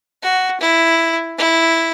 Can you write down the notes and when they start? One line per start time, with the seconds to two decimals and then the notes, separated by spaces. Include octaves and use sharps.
0.22 F#4
0.60 E4
1.38 E4